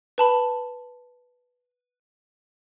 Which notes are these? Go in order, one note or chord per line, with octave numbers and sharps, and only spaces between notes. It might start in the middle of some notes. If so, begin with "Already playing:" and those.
B4 A5 B5